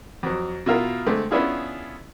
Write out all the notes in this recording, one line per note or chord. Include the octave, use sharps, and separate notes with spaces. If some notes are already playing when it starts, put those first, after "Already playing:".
F2 F#3
B2 E4 F4 A#4
D3 G#3 A3 C4
B3 C#4 D4 E4 F4 G#4